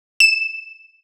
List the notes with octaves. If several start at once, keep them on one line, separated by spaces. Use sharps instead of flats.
E7